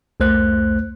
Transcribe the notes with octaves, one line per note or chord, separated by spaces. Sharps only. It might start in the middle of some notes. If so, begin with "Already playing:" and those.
C2 F2 A3 C5 F#6